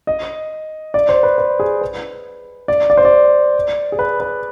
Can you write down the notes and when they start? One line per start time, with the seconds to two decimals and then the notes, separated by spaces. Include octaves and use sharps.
0.07 D#5
0.94 D5
1.09 C5
1.23 B4
1.38 B4
1.60 G#4
1.81 B4
2.68 D5
2.90 D5
2.97 C5
3.05 D5
3.92 G#4
3.99 B4
4.20 B4